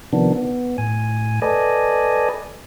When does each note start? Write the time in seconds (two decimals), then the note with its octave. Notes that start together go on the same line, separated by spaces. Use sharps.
0.13 C3 D#3 F3 B3 D4
0.36 B3
0.78 A2 G#5
1.42 A4 B4 D5 D#5 G#5